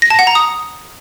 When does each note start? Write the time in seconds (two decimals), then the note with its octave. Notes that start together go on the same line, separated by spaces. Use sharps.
0.02 A#6
0.10 A5
0.19 F#5
0.27 A#5
0.35 D#6